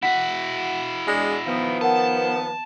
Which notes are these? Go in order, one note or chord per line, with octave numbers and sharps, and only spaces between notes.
E4 F#4 F#5 B6
G#3 D4 A#6
D#3 F3 B3
A#4 F#5 A5